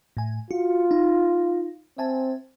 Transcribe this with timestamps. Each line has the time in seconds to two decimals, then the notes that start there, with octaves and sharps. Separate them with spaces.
0.17 A2 G#5
0.51 F4 F#4
0.91 D#4
1.98 C4 E5 G#5 A5